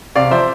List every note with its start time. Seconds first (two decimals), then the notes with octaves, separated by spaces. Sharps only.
0.15 C3 D5 F5
0.31 F3 C5 E5